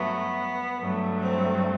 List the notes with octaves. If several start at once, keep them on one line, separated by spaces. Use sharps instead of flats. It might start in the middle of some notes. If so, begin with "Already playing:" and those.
Already playing: G2 F#3 A3 B3
G2 F#3 A3
C4